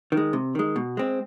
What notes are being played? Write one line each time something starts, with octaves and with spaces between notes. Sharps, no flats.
D#3
G#3
C3
D#3 G#3
B2
G#3 C4